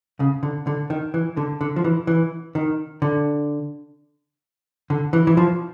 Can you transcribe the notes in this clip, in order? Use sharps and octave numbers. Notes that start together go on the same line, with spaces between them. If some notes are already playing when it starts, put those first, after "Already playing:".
C#3
D3
D3
D#3
E3
D3
D3
F3
E3
E3
D#3
D3
D3
E3
E3
F3